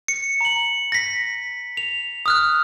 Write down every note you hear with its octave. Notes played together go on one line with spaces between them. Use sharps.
C#7
A#5 F#7
A#6 B6
F7
D#6 F6 F#6